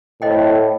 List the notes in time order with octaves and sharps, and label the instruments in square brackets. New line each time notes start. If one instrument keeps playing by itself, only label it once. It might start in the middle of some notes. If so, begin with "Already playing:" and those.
[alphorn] A2 [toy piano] C5 D#5 G5